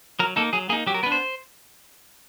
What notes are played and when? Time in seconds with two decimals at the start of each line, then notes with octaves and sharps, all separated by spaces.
0.19 F#3 A#4
0.36 A#3 D#4 A4
0.53 F#3 G#4
0.69 A#3 G#4
0.72 D#4
0.87 F#3 G4
0.94 A#4
1.03 B3 B4
1.06 D4
1.12 C5